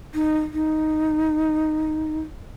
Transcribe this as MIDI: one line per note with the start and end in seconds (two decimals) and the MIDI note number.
0.15 0.39 63
0.54 2.19 63